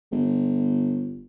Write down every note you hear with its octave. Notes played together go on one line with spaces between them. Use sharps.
G1